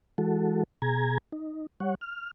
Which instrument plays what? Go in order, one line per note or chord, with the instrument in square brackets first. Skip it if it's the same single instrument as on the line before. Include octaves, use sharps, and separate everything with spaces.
[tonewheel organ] E3 G#3 F#4 A4
B2 G#4 A#5 G#6
D#4
G3 C#5 F#5
F6